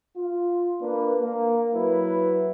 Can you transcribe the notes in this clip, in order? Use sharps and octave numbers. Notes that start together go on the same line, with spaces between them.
F4
A#3 D4 B4
A#3
F#3 E4 B4